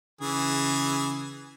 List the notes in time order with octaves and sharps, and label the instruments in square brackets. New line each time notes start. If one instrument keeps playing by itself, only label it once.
[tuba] C#3 [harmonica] E3 G#4